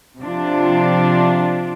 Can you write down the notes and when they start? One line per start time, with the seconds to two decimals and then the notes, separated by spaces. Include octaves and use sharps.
0.20 C3 F3 D4 F4